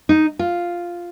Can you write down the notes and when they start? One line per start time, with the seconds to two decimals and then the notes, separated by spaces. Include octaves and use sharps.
0.09 D#4
0.39 F4